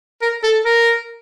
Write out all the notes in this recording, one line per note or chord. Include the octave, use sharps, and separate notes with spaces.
A#4
A4
A#4